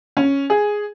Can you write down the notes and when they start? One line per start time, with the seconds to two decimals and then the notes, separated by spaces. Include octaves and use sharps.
0.17 C#4
0.50 G#4